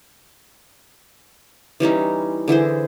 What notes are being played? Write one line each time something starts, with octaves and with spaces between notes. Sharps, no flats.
E3 G3 C#4 D#4
D3 E3 G#4 C5